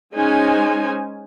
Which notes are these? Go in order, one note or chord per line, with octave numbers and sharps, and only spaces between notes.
G#3 C#4 D#4 C5 G#5